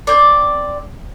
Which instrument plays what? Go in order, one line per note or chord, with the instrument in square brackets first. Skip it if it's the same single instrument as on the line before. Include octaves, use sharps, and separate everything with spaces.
[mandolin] C4 D5